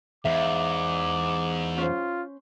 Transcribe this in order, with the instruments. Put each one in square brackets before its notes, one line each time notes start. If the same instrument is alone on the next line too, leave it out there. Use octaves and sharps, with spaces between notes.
[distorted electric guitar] E2 [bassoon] G#2 [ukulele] E5 F5 [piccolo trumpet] D6
[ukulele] C#4 C5 [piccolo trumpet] F4